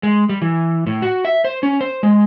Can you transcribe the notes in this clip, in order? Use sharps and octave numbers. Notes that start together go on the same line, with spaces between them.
G#3
G3
E3
A2
F#4
E5
C5
C#4
C5
G#3